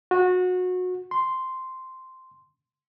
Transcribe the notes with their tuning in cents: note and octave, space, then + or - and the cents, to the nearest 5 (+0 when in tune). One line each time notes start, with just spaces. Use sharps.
F#4 -25
C6 -5